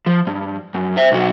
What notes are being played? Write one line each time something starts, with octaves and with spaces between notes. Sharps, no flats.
F3
G2
F#2
C5 E5
B1 F#4